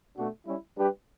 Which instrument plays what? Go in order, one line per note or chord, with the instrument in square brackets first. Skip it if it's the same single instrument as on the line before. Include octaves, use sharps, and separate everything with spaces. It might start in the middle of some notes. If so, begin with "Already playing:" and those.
[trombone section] B2 A3 D4 F#4
G3 C#4 E4
G3 D4 G4 B4